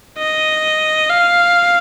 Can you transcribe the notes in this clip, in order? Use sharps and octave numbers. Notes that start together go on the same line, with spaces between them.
D#5
F5